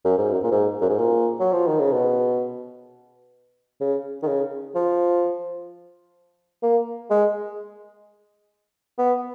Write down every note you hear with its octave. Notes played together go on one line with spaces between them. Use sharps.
F#2
G#2
F#2
A#2
G#2
F#2
G#2
A#2
F#3
F3
D#3
C#3
B2
C#3
D#3
C#3
F3
A#3
G#3
B3